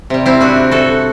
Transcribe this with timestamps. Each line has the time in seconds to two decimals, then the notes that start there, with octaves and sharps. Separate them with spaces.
0.10 C3 G3
0.26 C4 E4
0.41 D4 F#4
0.71 F#4 A4